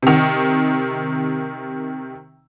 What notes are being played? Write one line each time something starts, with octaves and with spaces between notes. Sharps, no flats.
C3 D#3